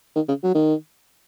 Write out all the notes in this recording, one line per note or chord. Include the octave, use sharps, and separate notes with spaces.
D#3
C#3
F#3
D#3